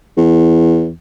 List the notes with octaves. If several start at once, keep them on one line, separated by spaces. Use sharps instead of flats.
E2